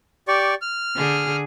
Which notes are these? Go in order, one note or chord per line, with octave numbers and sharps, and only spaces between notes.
G4 D5 C#6
F6
D3 G#4